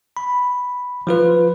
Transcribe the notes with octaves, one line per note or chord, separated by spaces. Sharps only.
B5
F3 F4 B4